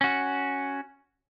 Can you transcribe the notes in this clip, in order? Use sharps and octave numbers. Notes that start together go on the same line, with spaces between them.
C#4 F#4